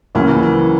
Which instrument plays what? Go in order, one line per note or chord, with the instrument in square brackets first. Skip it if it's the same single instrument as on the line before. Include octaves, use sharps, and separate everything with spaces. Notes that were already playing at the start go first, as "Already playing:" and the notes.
[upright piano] C#2 C#3 F#3 A#3 C#4 [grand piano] E3
[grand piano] E3